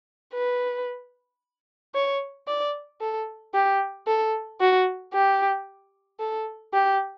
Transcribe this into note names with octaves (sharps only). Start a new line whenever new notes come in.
B4
C#5
D5
A4
G4
A4
F#4
G4
A4
G4